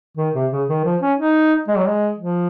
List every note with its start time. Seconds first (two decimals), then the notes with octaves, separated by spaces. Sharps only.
0.17 D#3
0.35 C3
0.52 C#3
0.68 D#3
0.84 F3
1.02 C#4
1.18 D#4
1.68 G#3
1.78 F#3
1.88 G#3
2.18 F3